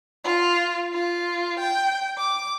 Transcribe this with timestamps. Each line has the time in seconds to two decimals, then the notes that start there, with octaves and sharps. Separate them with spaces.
0.24 F4
0.93 F4
1.59 G5
2.18 D6